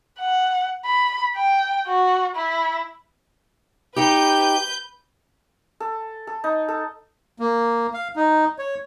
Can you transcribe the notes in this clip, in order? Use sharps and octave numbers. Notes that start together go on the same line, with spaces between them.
F#5
B5
G5
F#4
E4
D#4 G4 B4 G6
A4
A4
D#4
A4
A#3
F5
D#4
C#5